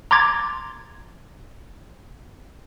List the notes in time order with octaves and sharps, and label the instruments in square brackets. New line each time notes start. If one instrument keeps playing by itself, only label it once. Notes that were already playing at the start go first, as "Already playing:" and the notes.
[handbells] A#5 C6 D6 G#6 A6